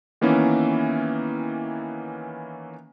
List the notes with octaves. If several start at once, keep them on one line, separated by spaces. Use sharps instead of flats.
D#3 E3 A#3 B3 C#4 E4